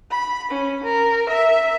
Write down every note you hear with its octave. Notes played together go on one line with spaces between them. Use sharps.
B5
C#4
A#4
E5